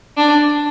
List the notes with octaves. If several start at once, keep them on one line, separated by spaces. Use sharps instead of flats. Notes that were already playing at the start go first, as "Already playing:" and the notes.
D4